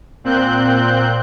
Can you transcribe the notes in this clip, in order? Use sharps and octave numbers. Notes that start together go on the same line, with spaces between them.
A#2 C4 F#6 G6